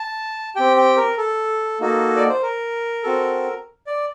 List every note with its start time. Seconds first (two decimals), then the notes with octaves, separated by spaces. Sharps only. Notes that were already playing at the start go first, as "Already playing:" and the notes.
Already playing: A5
0.56 C4 G4 G5
0.77 G5
0.97 A#4
1.18 A4
1.80 A#3 D#4 F#4 A4
2.16 D5
2.29 C5
2.42 A#4
3.03 C4 F#4 A4
3.87 D5